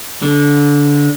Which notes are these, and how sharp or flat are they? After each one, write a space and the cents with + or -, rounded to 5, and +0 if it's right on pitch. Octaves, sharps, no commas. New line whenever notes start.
D3 -20